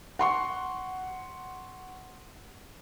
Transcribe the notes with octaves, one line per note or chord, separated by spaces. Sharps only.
F#5 C6 C#6